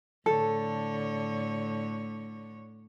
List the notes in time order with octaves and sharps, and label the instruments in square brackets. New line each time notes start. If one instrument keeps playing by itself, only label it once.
[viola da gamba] A2 D3 C#5 [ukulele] A4